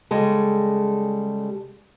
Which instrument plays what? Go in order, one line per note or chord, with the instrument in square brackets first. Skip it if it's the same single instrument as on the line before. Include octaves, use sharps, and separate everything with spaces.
[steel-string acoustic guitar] C#3 G3 G#3 A4